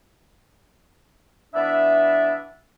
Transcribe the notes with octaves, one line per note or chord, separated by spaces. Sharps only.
E3 B3 D4 D5 E5